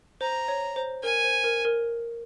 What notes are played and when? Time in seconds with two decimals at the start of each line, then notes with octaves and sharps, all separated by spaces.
0.21 C5 A#5
0.48 C#5
0.76 C5
1.03 A#4 G#5
1.24 C5
1.44 A#4
1.65 A#4